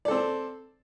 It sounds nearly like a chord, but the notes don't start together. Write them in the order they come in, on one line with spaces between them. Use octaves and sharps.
D5 A4 C4